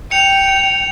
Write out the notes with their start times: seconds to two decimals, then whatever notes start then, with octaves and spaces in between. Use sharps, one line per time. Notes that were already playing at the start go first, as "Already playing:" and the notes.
0.11 G5 C#7 F7